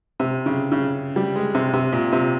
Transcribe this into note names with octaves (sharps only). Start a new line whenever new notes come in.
C3
C#3
C#3
G3
G#3
C3
C3
A#2
C3